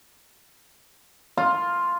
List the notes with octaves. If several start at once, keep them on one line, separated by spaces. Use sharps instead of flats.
F4